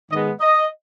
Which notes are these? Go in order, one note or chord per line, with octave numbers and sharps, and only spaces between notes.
G#2 D#3 G#3 B3 D#5
D#5